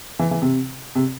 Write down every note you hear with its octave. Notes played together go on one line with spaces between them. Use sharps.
E3
E3
C3
C3